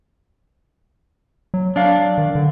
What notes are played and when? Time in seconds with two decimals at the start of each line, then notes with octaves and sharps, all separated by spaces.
1.54 F#3
1.76 D4 F5
2.18 D#3
2.35 D3